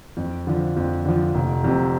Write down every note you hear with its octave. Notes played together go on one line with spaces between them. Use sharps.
F2
D3 F3
F2
D3 F3
F1
F2 C3